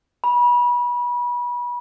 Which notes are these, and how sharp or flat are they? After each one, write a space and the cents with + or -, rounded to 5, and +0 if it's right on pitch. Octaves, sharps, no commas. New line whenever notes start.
B5 -30